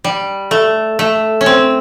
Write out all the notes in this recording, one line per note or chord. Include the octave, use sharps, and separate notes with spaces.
G3
A3
A3
C#4
C4